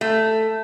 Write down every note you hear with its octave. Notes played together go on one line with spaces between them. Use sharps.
A3